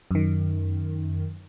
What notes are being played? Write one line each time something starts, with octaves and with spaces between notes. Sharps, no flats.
F#2 D#3